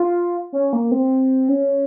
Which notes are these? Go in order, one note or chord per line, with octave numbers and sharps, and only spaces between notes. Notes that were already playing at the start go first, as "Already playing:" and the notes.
Already playing: F4
C#4
A#3
C4
C#4